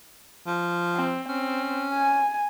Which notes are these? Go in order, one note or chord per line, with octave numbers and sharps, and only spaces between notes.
F3
C4
C4 C#4
G#5